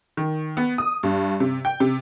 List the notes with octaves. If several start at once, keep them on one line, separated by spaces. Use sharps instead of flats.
D#3
B3
D#6
G2
C3
G5
C3